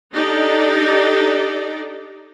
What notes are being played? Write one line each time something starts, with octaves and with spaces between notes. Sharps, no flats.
D4 D#4 G4 A4 D5 D#5